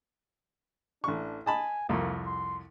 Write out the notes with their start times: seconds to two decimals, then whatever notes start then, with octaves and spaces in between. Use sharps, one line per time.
1.04 A1 D4 C#6
1.46 D#5 G#5 A5 B5
1.89 C2 F2 A#3
2.27 C6